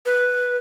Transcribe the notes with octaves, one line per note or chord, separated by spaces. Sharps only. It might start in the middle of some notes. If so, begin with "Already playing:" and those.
B4